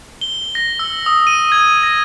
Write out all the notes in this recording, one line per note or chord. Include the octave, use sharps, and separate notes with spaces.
G7
A#6
E6
D#6
D#7
G#6
A#6